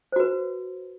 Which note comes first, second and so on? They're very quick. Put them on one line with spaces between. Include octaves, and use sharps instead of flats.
C5 F#4 B4